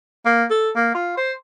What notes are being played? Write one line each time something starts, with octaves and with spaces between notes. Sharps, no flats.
A#3
A4
A#3
F4
C5